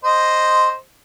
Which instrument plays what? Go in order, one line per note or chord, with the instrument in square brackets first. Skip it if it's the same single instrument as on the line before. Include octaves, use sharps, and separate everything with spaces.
[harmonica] C5 D#5